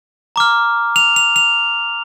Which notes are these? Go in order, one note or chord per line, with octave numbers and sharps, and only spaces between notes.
A#5 D6 F6
F7
F7
F7